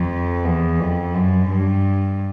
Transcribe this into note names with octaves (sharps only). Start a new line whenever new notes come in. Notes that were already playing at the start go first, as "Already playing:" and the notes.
Already playing: F2
E2
F2
F#2
G2